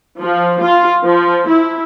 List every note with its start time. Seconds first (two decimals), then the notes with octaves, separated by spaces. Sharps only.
0.21 F3
0.62 F4
1.04 F3
1.48 E4